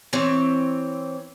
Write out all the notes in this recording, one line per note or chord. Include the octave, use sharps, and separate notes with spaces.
E3 C4 C#5